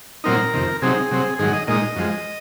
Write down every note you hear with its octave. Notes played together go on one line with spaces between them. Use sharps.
A#2 F#3 C4 D#4 A#4
F2 C3 D#3
C3 F#3 C4 D#4 G#4
C3 F#3 C4
G#2 D#3 F#3 G#4
D#5
A#2 G#3 D#4 D#5
F#2 F3 G#3